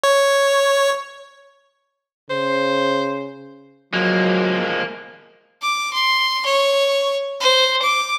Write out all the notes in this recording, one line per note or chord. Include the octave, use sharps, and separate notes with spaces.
C#5
C#3 C5
F3 F#3 G#3 A#3
D6
C6
C#5
C5
D6